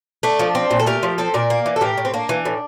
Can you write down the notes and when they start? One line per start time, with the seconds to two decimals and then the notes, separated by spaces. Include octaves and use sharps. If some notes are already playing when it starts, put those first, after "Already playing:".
0.23 A3 D4
0.39 F3
0.55 C4
0.71 A#2
0.80 A4
0.86 A3 G4 A#4
1.03 F3
1.18 C4 A4 C5
1.34 A#2 A#4 D5
1.50 A#3
1.66 E3
1.76 A4
1.81 A2 G4 A#4
1.97 A2
2.05 C4
2.14 A#3 D4
2.29 E3
2.45 A2